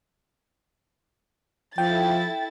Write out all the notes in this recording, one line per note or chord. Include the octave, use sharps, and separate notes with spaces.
F3 E4 A4 G5 A6